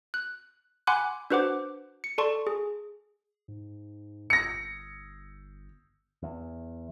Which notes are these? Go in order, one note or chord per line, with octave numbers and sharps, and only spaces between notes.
F#6
F#5 G#5 B5 C6 D6 F#6
D4 F#4 B4 C5 F#5 D6
C#7
A4 D5 A5 C6 C#6
G#4
G#2
G1 A#6 C#7
E2